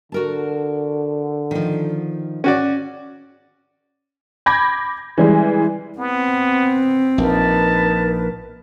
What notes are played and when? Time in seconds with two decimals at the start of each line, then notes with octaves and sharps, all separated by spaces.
0.12 D3 F#4 A#4 A5
1.51 D#3 F3
2.44 C#4 F#4 D5
4.46 B5 D6 G6 G#6 A#6
5.18 E3 G3 G#3
5.98 B3 C4
7.18 A#1 D#4 A#4 B4 A5